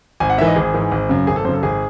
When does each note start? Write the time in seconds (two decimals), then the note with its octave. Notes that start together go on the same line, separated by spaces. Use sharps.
0.20 G#1 G#5
0.30 F#5
0.38 G#2 E5
0.41 E3
0.47 D#5
0.56 G#1 G#4
0.74 G#2 E3
0.91 G#1
1.09 F#2 C#3
1.27 G#1 G#4
1.36 A4
1.45 F#2 C5
1.49 C#3 A4
1.63 G#1 G#4